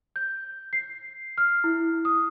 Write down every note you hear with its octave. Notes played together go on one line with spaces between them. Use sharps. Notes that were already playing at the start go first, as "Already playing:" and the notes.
G6
C7
F6
E4
D#6